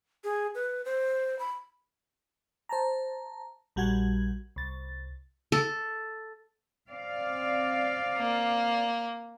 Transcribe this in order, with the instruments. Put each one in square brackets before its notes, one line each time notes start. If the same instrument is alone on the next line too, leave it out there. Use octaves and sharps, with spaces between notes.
[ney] G#4
B4
C5
B5
[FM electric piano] C5 A5 A#5
A#1 G3 F#4 F#5 G#6
C2 A6
[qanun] A4
[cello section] C4 D5 F5
[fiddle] A#3